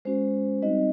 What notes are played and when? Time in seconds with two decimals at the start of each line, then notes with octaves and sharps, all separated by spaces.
0.05 G#3 C#4 F#4 C5
0.62 G3 C4 D#4 F#4 D#5